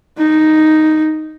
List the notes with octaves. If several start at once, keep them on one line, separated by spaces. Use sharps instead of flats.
D#4